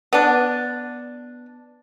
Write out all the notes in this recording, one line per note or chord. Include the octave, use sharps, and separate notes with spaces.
B3 D4